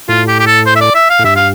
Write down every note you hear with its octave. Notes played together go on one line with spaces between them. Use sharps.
A2 F4
G4
G4
A4
C5
E5
D5
E5
F5
A2
G2 E5
F5